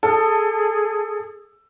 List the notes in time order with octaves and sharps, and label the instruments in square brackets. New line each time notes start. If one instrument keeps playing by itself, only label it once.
[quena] G#4 [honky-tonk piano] A4